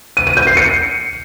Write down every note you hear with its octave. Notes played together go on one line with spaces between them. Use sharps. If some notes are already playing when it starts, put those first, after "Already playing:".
D#7
D#7
G6
C7
C#7